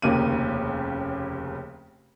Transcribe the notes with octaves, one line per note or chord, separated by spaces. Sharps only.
F1 D#2 C#3 A#3 D#7